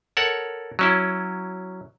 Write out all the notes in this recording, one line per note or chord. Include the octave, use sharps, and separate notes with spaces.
A4 A#4 C#5 F#5
F#3 C#4 E4